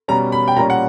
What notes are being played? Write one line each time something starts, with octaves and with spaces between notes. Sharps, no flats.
B2 G3 C#4 A#5
B5
G5
A#2 G3 C#4 A#5
F#5